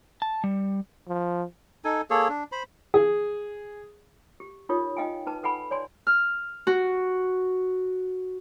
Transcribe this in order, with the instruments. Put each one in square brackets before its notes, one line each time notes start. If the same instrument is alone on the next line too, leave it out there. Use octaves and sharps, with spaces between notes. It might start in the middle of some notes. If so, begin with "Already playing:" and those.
[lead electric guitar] A5
G3
[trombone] F3
[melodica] D#4 A4 G#5
A#3 G#4 A4 C#5
D4
C5 B5
[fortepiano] G#4
[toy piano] G4
D#4 F4 G4 A#4 C#5 D#6
D#4 D#5 F5 G5 G#5
D#4 B4 A5
A4 B4 F#5 G#5 B5
C#5 D5 G#5 C6
[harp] F6
F#4